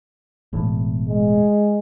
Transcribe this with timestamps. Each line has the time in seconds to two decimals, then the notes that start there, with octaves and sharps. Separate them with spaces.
0.53 E1 E2 A2
1.09 G#3